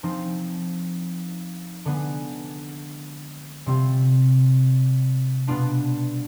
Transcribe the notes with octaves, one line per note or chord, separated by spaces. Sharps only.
F3 C4 D#4
D3 G#3 B3
C3 G3 C4 F4
B2 G3 B3 D4 F4